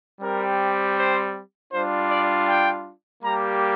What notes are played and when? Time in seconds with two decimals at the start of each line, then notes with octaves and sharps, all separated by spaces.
0.21 G3 C4 G4 A#4
0.97 C5
1.72 G3 D4 F4 C5
2.10 D5
2.48 G5
3.23 G3 A#3 G4 A#5